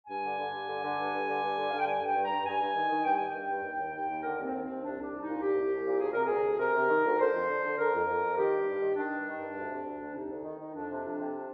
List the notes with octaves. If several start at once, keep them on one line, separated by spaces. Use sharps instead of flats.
G2 G#5
D3
D3
G2
D3
D3
G2
G2
D3
G2
D3
D3 F5
G5
G2 G#5
G2
G5
G2
G2 A#5
G2 G#5
G2
D#3
D#3
G2 G5
D#3 G#5
G5
G2
G2
D#2
D#2
D#2
D#2
D3 A#4
D#2
C4
D#2
C4
D#2
C2 D4
C2 D4
C2
D#4
A#2
C2 G4
C2
C2
A#2
D2 G#4
C3 A#4
D2 G#4
D2
C3 A#4
C3
D#3
D2
D3 C5
F2
D3
D3
D3 A#4
F2
F2
F2
D#3 G4
G2
G2
D#3
D#3 D4
G2
D#3
G2
D2
C3
D2
D2
C3 D#4
D2
D#3
D#3
F2 D4
C3
F2
C3